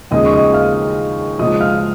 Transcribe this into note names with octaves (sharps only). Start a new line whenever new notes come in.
D#2 C#3 F3 G#3 D#5 D#6
C#6
D#5 D#6
F5 F6
C#2 C#3 F3 D#5 D#6
F5 F6